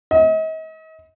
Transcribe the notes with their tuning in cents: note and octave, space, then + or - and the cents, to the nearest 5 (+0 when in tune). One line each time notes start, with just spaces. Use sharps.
D#5 +40